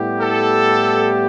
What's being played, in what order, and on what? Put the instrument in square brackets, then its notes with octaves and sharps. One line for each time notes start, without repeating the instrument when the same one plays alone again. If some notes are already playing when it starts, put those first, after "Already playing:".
Already playing: [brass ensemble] A2 G3 B3 E4 G4
[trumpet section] A4